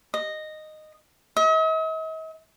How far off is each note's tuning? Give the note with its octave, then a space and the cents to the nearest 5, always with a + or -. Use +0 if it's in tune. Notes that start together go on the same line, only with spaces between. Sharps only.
D#5 -10
D#5 +45